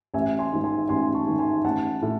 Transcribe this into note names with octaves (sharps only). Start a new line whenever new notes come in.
A1 E5 G#5
G#5 C6
G#2 D#3
G#5 C6
A1 G#5 C6
A5 C#6
G#2 D#3
G#5 C6
A1 F#5 A5
A2